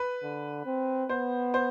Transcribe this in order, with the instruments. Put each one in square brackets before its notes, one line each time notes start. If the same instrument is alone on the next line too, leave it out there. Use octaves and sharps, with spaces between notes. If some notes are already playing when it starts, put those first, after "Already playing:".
Already playing: [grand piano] B4
[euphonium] D3
C4
[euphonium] B3 [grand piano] C5
[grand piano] C5